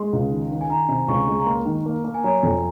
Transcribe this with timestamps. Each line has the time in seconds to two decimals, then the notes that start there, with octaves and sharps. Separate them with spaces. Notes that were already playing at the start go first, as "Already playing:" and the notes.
Already playing: G#3 C6
0.13 C#2
0.31 D#3
0.51 D#3
0.61 G#5
0.69 D#3 A#5
0.89 C3
1.08 C#2 C#6
1.28 G#3
1.40 A#5
1.46 A#3 C6
1.65 D#3
1.86 A#3
2.04 A#3
2.14 G#5
2.24 F#3 A#5
2.43 F2